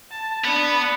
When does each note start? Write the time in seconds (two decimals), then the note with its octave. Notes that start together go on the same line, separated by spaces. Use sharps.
0.11 A5
0.45 B3 D4 B5